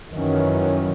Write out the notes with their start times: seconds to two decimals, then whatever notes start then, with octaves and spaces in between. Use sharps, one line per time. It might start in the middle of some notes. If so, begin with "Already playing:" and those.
0.11 F#2 D#3 E3 F#3 C#4